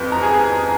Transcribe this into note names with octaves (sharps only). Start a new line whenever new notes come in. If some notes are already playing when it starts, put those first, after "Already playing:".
Already playing: F2 F3 B4
A#5
G#4 G#5